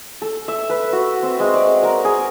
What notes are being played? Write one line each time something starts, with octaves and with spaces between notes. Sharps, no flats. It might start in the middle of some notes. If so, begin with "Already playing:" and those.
A4
E5
B4
F#4
C4
G#3
D5
A#4
G#4